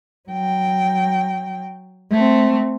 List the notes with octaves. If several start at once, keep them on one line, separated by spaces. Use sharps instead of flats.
F#3 G5
A3 C4